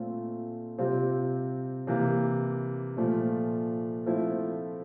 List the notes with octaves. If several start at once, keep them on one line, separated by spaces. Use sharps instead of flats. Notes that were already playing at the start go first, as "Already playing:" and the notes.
Already playing: A#2 A3 C4 F4 A4
C3 G3 C4 F4
C3 E3 A#3
A#2 F3 A3
F3 A3 C4 E4